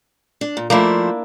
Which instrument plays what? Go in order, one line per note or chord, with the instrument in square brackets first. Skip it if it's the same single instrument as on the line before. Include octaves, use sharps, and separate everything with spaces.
[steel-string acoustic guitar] D4
A#2
[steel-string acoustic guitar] F3 A3 C5 [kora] A#3 D4 E4